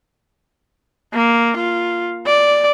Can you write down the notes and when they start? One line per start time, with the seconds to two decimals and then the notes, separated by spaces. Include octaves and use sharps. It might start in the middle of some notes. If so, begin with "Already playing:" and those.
1.13 A#3
1.57 F4
2.26 D5